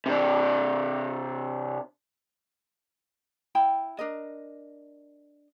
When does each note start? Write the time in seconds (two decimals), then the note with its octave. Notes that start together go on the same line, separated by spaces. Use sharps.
0.06 C3 D4
3.55 E4 G5 B5
3.99 D4 A#4 D#5